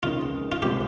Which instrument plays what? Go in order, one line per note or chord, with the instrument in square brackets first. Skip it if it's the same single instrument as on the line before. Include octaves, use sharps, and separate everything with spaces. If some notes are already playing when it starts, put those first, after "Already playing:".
[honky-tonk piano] C#2 C#3 F3 A#3 D#4 [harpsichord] F4
[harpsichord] F4
[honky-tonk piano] C2 C3 F3 G#3 [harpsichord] G4